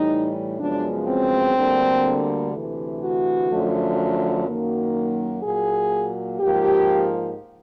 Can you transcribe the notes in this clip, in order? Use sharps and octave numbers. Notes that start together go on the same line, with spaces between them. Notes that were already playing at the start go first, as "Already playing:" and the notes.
Already playing: A2 E3 G3 D#4
F#2 C#3 F3 G#3 B3 D4
C4
D2 D3 G3 A#3
D2 C3 E3 A3
F#4
F#2 D3 F3 A3
F#2 D#3 F#3 A#3
A#2 F#3 A#3 G#4
G#2 F3 A#3 G4